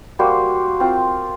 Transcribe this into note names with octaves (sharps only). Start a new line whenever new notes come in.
G3 A#3 F#4 C5
C4 F4